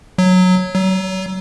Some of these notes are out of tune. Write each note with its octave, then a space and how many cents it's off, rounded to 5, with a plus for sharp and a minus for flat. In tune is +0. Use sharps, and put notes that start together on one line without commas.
F#3 -10
F#3 +35